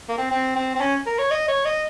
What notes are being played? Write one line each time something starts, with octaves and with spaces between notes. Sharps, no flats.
A#3
C4
C4
C4
C4
C#4
A#4
C#5
D#5
C#5
D#5